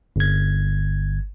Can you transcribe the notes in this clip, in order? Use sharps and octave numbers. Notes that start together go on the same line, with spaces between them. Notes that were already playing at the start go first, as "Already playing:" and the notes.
G1 G#6